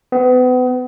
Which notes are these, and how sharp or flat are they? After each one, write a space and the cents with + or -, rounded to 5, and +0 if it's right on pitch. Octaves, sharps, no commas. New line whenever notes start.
B3 +35